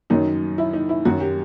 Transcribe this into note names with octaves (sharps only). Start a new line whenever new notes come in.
F#2 D#3 F#3 D#4
E4
D#4
E4
F#2 D#3 F#3 F#4
G4